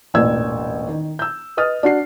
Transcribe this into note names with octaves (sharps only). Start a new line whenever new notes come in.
E1 A1 A#2 D5 E6 G#6
D#3
E6 G6
B4 D#5 D#6 F6 A6
D4 F#4 C7